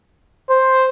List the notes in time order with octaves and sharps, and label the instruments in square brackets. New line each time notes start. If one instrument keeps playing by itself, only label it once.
[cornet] C5